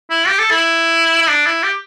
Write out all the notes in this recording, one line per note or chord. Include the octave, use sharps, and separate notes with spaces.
E4
G4
A4
E4
E4
D4
E4
G4